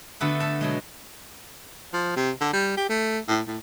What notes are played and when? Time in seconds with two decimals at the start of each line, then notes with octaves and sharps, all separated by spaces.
0.20 D3 A3 B3 F#4 A4 B4
0.40 A4 B4 A5
0.61 B2 F#3 G#3
1.93 F3
2.16 C3
2.41 D3
2.53 G3
2.77 G4
2.89 A3
3.28 A2
3.47 A2